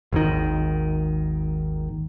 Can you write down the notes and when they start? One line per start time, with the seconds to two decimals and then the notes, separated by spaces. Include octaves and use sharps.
0.13 G#1 D#2 D#3